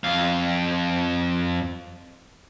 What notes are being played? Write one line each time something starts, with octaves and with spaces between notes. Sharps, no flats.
F2 F5